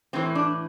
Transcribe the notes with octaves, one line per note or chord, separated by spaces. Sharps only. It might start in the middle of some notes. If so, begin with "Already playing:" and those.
A2 E3 C4
D4